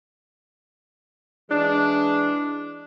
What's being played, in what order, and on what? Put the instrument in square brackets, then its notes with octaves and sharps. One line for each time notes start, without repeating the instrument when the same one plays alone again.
[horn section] E3 G#3 D4